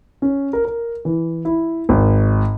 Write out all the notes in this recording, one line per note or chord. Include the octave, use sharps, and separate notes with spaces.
C#4
A#4
A#4
E3
E4
G#1